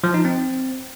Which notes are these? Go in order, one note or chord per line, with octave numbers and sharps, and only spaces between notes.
F3
D#4
C4